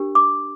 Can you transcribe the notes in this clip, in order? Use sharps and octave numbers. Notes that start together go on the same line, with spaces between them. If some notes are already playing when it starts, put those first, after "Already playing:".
Already playing: D4 G4 A#4
D6